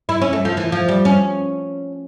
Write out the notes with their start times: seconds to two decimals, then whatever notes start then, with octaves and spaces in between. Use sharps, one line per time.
0.09 E4
0.22 C#4
0.33 A3
0.45 F3
0.57 E3
0.72 F3
0.89 G3
1.05 C#4